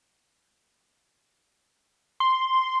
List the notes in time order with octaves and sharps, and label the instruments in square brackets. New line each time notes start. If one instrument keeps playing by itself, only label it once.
[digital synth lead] C6